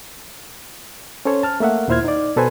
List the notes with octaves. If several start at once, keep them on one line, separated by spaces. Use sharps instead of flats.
C#4 A4 C5 C#5
A5 F6
A3 A#3 E5 F#5
D#2 A#2 E4 C5 F6 G#6
D#4 D5
B2 A4 B4 C5 G#5